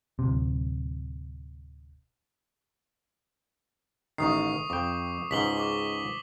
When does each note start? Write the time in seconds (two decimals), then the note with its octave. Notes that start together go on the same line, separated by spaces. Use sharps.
0.19 D1 C3
4.18 A1 D#3 C#6 D#6 C7
4.70 F2 G5 D6
5.31 C#2 G#2 B6 F#7 G7
5.58 C#6 D6